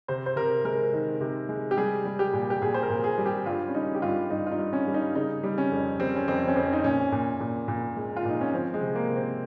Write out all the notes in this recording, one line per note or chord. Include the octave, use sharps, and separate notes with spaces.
C3 C5
C5
C3 A#4
G#3 A#4
D#3
C3
G#3
G4
G3 G#4
G3
G4
A#2
G4
A#2 G#4
C5
A#4
A#2
G#4
G3
G4
G2 F4
C#4
G3 D#4
G4
G2 F4
G2 D#4
F4
D#4
G2
C#4
G3
D#4
C#3 D#4
G3
C#4
F2
G3 C4
C#4
F2 C4
C#4
F2 C4
D#4
A#2 C#4
A#2
A#2
A#2
G#3
F4
A#2 D#4
C#4
F3 C4
G#3
C3
A#3
C3
C4